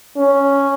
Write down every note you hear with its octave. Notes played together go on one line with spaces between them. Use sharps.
C#4